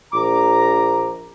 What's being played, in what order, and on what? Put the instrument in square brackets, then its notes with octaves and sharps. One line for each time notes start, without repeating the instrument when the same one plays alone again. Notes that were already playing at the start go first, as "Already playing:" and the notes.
[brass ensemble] A#1 A#5 [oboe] D6